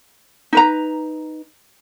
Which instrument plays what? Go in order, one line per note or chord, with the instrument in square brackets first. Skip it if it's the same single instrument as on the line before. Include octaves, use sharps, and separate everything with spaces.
[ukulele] D#4 B4 A#5